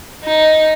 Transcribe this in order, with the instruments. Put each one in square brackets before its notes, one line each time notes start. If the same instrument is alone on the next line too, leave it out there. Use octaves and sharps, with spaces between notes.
[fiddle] D#4